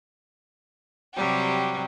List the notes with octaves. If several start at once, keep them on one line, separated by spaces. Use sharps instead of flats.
C3 F#3 G3 G4